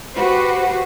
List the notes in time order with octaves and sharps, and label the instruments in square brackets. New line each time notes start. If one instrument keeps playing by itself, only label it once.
[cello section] F#4 G4 B4 C5